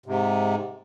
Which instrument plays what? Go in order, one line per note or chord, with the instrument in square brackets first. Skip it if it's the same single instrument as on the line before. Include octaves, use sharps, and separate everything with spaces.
[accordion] G#2 C3